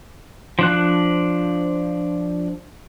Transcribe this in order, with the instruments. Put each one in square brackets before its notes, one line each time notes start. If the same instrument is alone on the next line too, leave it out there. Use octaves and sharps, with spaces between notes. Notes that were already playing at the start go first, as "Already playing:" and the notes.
[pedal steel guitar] F3 D4 F#6